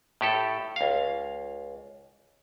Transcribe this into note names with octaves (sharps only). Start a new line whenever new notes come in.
A2 G4 A4
C#2 F5